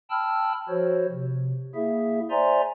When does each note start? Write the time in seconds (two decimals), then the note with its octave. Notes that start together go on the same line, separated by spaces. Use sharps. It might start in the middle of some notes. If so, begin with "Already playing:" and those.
0.10 G5 A5 B5 E6 F6
0.69 F3 F#4 C5 C#5
1.11 C3
1.75 A#3 E4 G#4 E5
2.30 C5 D5 E5 G#5 A#5 C6